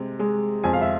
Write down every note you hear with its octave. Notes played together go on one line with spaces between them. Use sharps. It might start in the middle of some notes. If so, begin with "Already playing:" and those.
Already playing: C3 G#3
G#3
F2 G#5
F5
E5